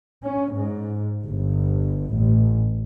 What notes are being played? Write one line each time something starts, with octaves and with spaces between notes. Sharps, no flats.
C#4
G#2
G1
A1